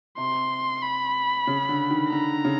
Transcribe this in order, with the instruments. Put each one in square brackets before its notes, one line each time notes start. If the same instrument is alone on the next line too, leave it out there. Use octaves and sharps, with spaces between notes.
[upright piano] C3 [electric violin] C6
[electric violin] B5
[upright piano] C#3
D3
D#3
[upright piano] D3 [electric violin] A#5
[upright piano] C#3